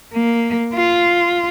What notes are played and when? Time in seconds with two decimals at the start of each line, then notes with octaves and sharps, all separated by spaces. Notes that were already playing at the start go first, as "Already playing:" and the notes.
0.13 A#3
0.74 F4